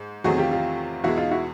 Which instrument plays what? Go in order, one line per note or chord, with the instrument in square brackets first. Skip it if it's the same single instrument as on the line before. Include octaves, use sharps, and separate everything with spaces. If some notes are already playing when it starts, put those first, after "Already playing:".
Already playing: [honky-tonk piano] G#2
[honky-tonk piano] E2 C3 D#3 F#3 A3 [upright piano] F#4 G#4
[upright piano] F4 G4
F4 G4
[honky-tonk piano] E2 B2 G#3 [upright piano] E4 F#4
[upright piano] D#4 F4
E4 F#4